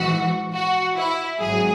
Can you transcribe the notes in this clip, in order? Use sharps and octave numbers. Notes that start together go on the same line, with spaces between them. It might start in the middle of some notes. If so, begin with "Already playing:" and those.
Already playing: A#1 G#2 E3 F#4
F#4
E4
G#1 G#2 F#3 G#4